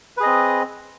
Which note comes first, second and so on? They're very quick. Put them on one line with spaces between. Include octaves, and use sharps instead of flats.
B4 G#4 D#5 C4